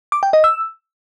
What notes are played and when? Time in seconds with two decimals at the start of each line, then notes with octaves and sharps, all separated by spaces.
0.12 D6
0.23 G5
0.33 D#5
0.44 E6